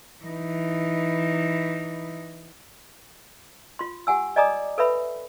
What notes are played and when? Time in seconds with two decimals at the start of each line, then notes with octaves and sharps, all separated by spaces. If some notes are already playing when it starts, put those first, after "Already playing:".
0.24 E3 D#4
3.79 F4 C6
4.07 G4 F#5 G#5 E6
4.36 D5 D#5 G#5 A#5 D6 D#6
4.78 A4 B4 C#5 E5 B5